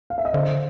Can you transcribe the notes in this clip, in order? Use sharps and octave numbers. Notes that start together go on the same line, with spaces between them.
F5
E5
D#5
D3 C5 D5